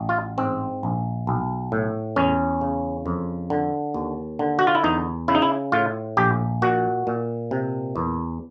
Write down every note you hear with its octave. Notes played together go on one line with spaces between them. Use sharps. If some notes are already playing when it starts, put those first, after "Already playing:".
Already playing: A1
F4
G#2 C4
A#1
B1
A2
E2 C#4
C#3
F2
D3
D#2
D3
F#4
F4
E4
E2 D#4
C#3 E4
D#4
E4
A2 F4
A#1 G4
A#2 F#4
A#2
C3
E2